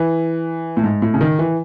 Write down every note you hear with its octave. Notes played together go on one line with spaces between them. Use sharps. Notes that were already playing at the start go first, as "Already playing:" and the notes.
Already playing: E3
A2
G#2
A2
C#3
D#3
E3